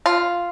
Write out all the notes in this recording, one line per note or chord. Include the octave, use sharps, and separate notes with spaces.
F4